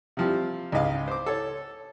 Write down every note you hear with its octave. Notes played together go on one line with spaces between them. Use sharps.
C3 F3 G3
C#2 G#2 D#5 F5
C5 D6
A4 C#5